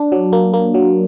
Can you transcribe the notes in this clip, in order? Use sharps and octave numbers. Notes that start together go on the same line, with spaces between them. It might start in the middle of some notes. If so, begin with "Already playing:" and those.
Already playing: D4
F#3
A#3
A#3
F#3